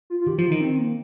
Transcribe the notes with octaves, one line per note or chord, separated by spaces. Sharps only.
F4
F4
D#3 G4
F3 F4
D#3 D#4
C4
A#3